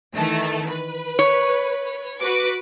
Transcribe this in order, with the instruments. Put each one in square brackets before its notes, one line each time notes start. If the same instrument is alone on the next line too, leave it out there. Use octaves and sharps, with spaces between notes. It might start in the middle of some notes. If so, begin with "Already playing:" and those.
[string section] D#3 E3 A3
B4
[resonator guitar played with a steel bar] C#5
[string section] F#4 B4 D6